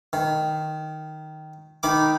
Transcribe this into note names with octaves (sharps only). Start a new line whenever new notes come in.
D#3
D#3 D#4 B5 D6